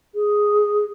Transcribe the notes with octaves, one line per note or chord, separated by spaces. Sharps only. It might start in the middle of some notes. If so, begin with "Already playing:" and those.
G#4